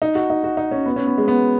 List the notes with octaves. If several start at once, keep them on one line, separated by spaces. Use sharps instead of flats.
D#4
F#4
D#4
F#4
D#4
C#4
B3
C#4
B3
G#3
B3